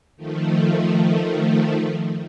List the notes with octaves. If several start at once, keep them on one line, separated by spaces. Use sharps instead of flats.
D#3 F3 A3